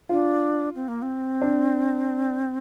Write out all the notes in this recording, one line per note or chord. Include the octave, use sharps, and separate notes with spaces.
D4 F4
C4
A#3
C4
D4